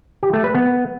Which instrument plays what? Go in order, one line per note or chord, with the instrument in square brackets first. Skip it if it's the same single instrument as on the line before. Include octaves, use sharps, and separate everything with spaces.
[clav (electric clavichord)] G4
A3
B4
B3